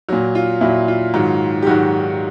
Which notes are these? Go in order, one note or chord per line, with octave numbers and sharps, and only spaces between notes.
A#2 F#3
F4
A#2 F#3 E4
F4
G#2 D#3 F#3
G4
G#2 D#3 F#3 F#4